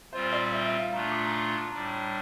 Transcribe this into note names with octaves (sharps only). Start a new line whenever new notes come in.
A#2 G3 C4 F4 C5
D5
E5
E5
F5
A#2 A3 D4 F4 A#5
C6
D6
A#5
C6
A5
D6
A2 G3 D4 A#5